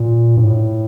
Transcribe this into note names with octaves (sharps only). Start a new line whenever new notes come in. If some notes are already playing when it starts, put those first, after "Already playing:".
Already playing: A#2
G2
A2